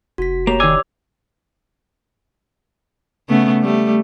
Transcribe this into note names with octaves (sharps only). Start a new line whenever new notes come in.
F1 F#4 B6
A#3 G4 C#5 F7
D#3 D5 G#5 D6 E6 G#6
C#3 A3 B3
G3 A3